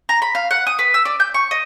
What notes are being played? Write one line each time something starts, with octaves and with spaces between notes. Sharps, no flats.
A#5
B5
F5
F#5
D#6
B4
E6
D5
G6
C#6
D#5